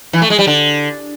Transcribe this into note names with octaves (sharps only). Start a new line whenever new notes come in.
E3
A3
G#3
G3
D3